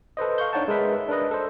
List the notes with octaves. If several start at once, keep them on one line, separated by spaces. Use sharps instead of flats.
A4 B4 C5 D#5
F5 C#6 G6
D4 D#4 C#5 F#5 A5
G#3 G#4 A#4 B4 E5
D4 A#4 B4 D#5
A4 C5